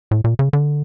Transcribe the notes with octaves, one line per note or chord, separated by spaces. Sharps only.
A2
A#2
C#3
D3